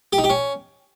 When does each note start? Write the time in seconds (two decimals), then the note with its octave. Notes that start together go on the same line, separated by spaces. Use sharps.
0.13 G4
0.18 D#4
0.24 G4
0.30 C#4